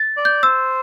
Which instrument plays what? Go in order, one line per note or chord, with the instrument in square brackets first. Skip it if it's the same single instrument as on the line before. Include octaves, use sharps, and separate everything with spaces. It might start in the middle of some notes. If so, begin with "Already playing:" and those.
Already playing: [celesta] A6
[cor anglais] D5
[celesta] G6
[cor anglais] C5 [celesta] E6